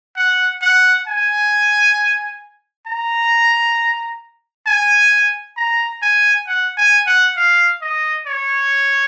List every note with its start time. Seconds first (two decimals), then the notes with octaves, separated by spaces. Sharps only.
0.16 F#5
0.62 F#5
1.07 G#5
2.87 A#5
4.67 G#5
5.57 A#5
6.02 G#5
6.47 F#5
6.77 G#5
7.06 F#5
7.37 F5
7.82 D#5
8.27 C#5